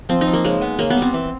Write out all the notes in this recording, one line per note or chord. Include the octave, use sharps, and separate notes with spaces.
F3 C4
D#4
F3
A#3
C#3 G#3
B3
C#3 A#3
B3
G3
C4
E3